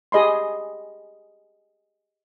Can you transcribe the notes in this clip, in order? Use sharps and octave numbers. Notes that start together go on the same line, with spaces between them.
G4 G#4 D#5 B5 C6